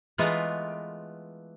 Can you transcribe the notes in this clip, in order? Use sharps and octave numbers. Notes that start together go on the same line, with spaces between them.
E3 G#3 A3 B3 F4 A#4